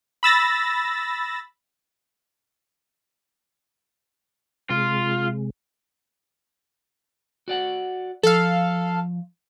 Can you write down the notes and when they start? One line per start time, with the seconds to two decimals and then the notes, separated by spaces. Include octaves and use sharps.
0.23 B5 E6 A6 A#6
4.70 C3 G#3 F4
7.48 F#4 D5 F#5
8.23 F3 A4 F5